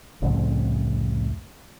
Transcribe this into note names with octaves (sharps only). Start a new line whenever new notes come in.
C2 F2 A2 C#3